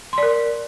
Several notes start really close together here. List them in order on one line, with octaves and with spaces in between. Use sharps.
C6 D5 A#4